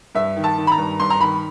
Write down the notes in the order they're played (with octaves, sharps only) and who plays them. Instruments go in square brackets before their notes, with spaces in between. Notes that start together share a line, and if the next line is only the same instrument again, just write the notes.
[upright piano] G2 E5
D#3
A5
D#3
B5
A#5
G2
G2 C6
A#5
D#3 B5